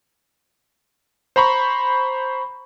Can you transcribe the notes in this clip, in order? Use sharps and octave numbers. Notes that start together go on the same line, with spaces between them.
C5 A#5 B5 C#6